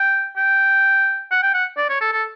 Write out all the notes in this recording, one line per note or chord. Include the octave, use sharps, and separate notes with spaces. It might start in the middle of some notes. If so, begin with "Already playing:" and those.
Already playing: G5
G5
F#5
G5
F#5
D5
C#5
A4
A4